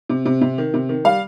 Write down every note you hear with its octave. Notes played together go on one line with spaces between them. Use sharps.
C3
C3
C3
D#3
C3
D#3
G3 F5